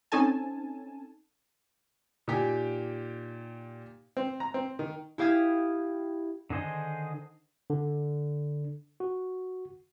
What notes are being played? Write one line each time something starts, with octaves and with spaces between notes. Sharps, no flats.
C4 C#4 D#4 A4 G#5 A5
A#2 D#4 G4 G5 G#5
C4
A#5
C4
D#3
E4 G4 F5 D#6 G#6
D3 D#3 G#4 C5 D#5
D3
F#4